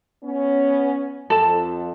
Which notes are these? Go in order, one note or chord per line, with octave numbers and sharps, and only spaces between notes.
B3 C#4
F2 A4 A5